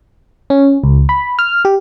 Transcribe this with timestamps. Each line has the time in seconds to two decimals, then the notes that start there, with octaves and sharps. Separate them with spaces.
0.50 C#4
0.84 C#2
1.09 B5
1.39 F6
1.65 G4